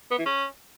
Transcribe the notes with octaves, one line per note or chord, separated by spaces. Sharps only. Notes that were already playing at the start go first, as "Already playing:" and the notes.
B3
E3
C#4